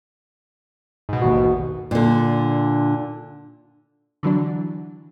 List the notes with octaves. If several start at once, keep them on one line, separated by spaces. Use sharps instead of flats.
G#2 B2
A1 D#2 F#4
A#2 D3
D3 E3 F#3 D4